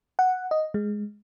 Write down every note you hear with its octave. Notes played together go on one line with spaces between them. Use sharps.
F#5
D#5
G#3